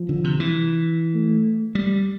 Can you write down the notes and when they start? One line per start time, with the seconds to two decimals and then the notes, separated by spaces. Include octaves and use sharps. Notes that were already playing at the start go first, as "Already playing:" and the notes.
Already playing: F3
0.09 D3
0.24 C3
0.40 E3
1.15 A3
1.75 G3